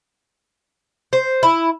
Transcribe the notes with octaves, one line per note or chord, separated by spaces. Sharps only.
C5
E4